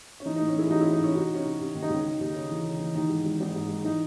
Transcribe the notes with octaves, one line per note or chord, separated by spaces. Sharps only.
C#4
E3 D#4
A2 D#4
C#4
E3 E4 G#4
G#4
A1 D#4 F#4
A1 C#4 E4
D#4
A1 C#4 E4
C3 D#4 F#4
C3 C#4
D#4
C3
C3
D#3
D#4
C#2
C#3
D#2
C#3
E3
C#3
E3
D#3 D#4
G#2
G#1
G#1
G#2
G#2
E3 D#4